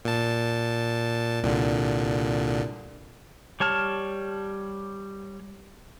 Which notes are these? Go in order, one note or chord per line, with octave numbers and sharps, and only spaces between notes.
A#2 A5
C2 A#2 D3
G3 C#5 A5 F6